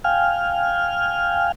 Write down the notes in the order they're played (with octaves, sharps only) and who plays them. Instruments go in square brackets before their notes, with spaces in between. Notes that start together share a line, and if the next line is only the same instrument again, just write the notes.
[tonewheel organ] F5 G5 G#5 F6